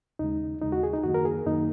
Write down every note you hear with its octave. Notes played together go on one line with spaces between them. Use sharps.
D#2 C#3 G#3 D#4
D#2 C#3 G#3 D#4
F#4
G#4
D#4
F#2 D#3 A#3 F#4
A#4
G#4
F#2 D#3 A#3 D#4